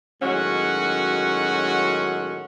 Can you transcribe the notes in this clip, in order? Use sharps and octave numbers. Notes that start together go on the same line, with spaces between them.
A2 D#3 F#3 G#3 C#4 F#4